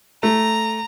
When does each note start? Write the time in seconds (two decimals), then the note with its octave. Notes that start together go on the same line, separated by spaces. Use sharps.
0.23 A3 A#5